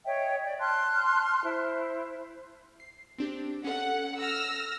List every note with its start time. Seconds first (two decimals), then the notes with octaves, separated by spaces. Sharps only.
0.05 C#5 D#5 E5 G5
0.44 D5 G5
0.60 A5 C6 F6 F#6
1.44 E4 C5
2.80 C7
3.18 C4 D4 G4
3.64 C#4 A4 F#5
4.20 E6 F6 A#6